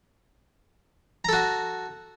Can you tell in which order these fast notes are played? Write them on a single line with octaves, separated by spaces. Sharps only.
A#5 A4 F#4